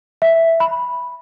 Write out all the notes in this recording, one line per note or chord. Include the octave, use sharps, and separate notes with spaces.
E5
B5